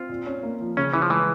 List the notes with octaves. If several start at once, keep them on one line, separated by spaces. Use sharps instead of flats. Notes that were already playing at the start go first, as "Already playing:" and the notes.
Already playing: C4 F4
A#2
C#4
A#3
F3
C#3 C#4
E3 E4
F3
E3 G#3